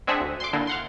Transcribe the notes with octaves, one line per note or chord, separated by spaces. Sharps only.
G#3 C4 D4 G#4 E5 F#5
D2
C6 D6
A#2 D3 A#3 D4 E4
F5 F#5 C6